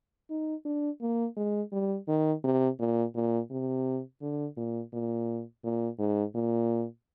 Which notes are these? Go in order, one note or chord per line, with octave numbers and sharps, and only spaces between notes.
D#4
D4
A#3
G#3
G3
D#3
C3
A#2
A#2
C3
D3
A#2
A#2
A#2
G#2
A#2